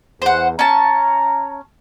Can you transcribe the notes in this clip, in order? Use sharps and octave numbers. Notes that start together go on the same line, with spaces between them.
E2 C5 F#5
C#4 A5 A#5